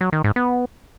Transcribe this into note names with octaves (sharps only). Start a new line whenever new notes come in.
F#3
D#3
G#2
B3